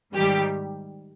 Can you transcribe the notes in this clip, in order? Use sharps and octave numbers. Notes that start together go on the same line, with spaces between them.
G#2 D#3 G3 G4